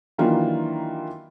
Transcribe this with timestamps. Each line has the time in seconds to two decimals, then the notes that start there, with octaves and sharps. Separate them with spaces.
0.18 D#3 E3 F#3 A#3 D4 F4